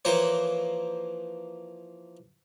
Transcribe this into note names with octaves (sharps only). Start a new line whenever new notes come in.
E3 F3 A#3 C5 C#5